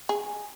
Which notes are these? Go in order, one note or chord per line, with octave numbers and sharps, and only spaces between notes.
G#4